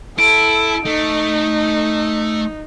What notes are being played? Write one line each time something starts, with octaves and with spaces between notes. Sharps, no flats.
E4 A4 D7
A3 D#4